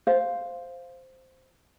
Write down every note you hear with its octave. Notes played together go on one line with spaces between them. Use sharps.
C5 F5